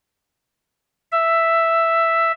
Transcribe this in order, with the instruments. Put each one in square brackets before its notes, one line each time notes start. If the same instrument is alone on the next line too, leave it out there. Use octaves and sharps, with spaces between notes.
[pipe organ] E5